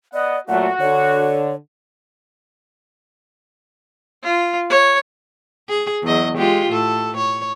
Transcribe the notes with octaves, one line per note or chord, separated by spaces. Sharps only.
B3 D5 D#5 F#5
A#2 F#3 A3 F#4 F#5
D3 C#5
F4
C#5
G#4
E2 F#3 D#5
G#3 F4 G4
A2 A4
C#5